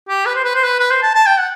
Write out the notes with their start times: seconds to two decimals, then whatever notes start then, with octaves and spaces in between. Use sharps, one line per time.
0.09 G4
0.26 B4
0.35 C5
0.44 B4
0.55 C5
0.64 B4
0.80 B4
0.91 C5
1.03 A5
1.15 A5
1.27 G5
1.38 F#5